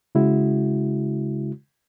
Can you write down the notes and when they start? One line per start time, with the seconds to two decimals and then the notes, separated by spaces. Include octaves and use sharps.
0.15 C#3 G#3 E4 F#4